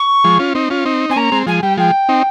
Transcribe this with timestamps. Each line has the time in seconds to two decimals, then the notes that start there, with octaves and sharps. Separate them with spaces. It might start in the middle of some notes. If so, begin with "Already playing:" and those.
Already playing: C#6
0.24 F3 G#3
0.39 C#4 F4
0.55 C4 D#4
0.70 C#4 F4
0.85 C4 D#4
1.10 C4 G#5
1.16 A#3 C#4 A#5
1.32 G#3 C4
1.47 F3 G#3 G#5
1.62 G3 G5
1.77 F3 G#3 G5
2.09 C4 D#4